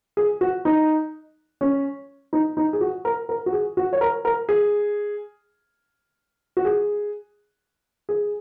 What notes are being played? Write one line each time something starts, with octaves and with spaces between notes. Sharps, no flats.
G#4
F#4
D#4
C#4
D#4
D#4
G#4
F#4
A#4
A#4
F#4
G#4
F#4
C#5
A#4
A#4
G#4
F#4
G#4
G#4